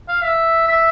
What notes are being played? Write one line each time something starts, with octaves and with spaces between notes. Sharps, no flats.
F5
E5
E5